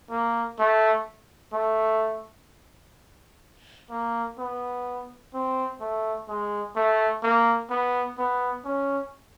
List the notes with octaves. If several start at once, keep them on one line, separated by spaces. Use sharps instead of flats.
A#3
A3
A3
A#3
B3
C4
A3
G#3
A3
A#3
B3
B3
C#4